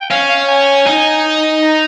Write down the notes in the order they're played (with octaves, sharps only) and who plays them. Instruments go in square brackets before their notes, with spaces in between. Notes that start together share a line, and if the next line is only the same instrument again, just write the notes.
[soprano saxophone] G5
[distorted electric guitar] C#4 [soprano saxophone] F5
[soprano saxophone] F5
G#5
[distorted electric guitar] D#4
[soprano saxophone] A#5